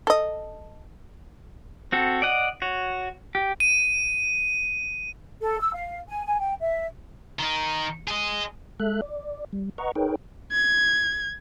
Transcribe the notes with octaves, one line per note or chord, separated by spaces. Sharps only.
A4 D#5
C4 F#4 A4
D5 D#5 F#5
F#4 C#5
G4
D#7
A4
E6
F5
G#5
G#5
G5
E5
D#3 D#4
G#4 D#5
G#3 A4 E5 F#6
D5
G3
B4 D#5 F#5 A#5 C#6
D#4 G#4 A#4 B4 C#5 G5
G#6